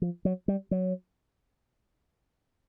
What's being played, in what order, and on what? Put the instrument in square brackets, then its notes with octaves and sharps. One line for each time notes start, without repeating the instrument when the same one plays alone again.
[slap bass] F3
F#3
G3
F#3